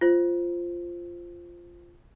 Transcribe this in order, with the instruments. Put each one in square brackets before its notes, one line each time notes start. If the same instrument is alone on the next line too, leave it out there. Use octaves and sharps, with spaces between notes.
[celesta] F4 C5